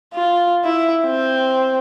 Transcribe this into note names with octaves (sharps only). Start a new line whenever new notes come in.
F4
E4
C4